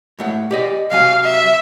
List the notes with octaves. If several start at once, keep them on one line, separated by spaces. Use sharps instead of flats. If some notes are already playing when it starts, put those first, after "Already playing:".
A2 A3 F#5
G4 D5 D#5
C3 F#3 F5 G#5
E5